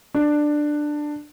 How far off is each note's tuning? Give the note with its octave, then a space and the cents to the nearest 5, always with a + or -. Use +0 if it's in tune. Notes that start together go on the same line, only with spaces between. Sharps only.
D4 +15